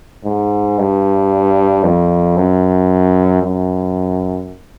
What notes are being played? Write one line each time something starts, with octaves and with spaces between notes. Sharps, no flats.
G#2
G2
F2
F#2
F#2